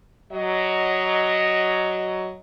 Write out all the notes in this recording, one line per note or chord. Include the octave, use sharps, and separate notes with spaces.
F#3 D#5